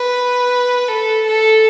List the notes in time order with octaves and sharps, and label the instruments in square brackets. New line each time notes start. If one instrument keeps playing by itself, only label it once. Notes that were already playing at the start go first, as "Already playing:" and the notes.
Already playing: [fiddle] B4
A4
A4